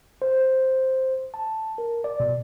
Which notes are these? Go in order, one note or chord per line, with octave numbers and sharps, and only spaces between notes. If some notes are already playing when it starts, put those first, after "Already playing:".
C5
A5
A#4
D5
B2